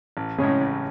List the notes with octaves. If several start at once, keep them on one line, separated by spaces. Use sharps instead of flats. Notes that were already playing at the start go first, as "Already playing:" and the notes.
A1
A2 C#3 G#3 C#4 G#4
A1